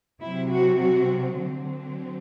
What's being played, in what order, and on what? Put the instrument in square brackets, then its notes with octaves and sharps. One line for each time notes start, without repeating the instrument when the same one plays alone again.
[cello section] C3 F#3 C4 E4
F#4
F#4
D3 F#3 C4